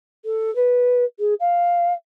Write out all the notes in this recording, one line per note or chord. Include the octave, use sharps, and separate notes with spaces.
A4
B4
G#4
F5